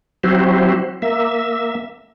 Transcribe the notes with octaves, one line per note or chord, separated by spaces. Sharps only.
F#3 C4 E4 F#4 G4 C5
A#3 E5